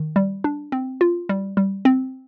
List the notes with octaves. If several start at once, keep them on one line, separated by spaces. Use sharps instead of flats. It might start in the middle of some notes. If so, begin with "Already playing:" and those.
Already playing: D#3
G3
D4
C4
F4
G3
G3
C4